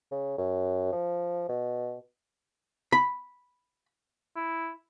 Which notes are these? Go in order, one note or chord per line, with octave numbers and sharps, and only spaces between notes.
C#3
F#2
F3
B2
B5
E4